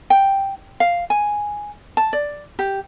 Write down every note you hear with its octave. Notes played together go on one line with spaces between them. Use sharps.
G5
F5
G#5
A5
D5
G4